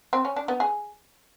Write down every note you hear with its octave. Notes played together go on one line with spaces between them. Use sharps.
C4
C#4
D4
B3
G#4